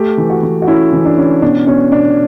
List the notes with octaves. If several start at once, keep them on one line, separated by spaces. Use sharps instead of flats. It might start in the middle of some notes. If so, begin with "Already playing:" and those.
Already playing: A3 G4
E3
F#4
E3
F#4
C#4 E4
E3
D4
C#4
B2 D4
B2 C#4
B2 D4